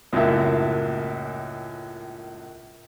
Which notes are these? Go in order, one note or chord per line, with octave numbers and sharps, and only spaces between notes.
C#2 F#2 A2 A#3 E5